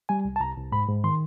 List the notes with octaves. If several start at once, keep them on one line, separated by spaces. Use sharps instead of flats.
G3 G#5
C2
A5
C2 A#5
C2
G#2 B5
G#2
D#3 C6